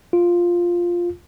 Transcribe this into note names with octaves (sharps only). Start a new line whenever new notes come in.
F4